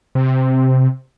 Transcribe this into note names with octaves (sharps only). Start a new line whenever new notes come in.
C3